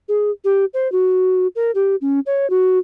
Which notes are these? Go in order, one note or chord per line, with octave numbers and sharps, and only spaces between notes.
G#4
G4
C5
F#4
A#4
G4
C#4
C#5
F#4